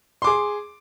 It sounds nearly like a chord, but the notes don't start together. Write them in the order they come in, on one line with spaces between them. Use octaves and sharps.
C6 D6 G#4